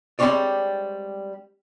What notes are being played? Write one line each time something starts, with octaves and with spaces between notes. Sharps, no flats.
G3 G#3 C4 D4 C#5 D5